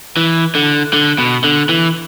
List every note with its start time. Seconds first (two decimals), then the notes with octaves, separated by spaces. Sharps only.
0.17 E3
0.55 D3
0.93 D3
1.18 B2
1.44 D3
1.69 E3